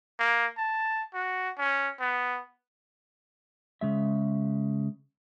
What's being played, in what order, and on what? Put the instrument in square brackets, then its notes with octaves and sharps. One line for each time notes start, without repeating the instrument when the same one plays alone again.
[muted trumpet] A#3
A5
F#4
C#4
B3
[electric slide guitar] C#3 G#3 E5